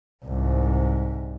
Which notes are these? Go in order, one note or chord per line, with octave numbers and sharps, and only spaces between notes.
C2 G#2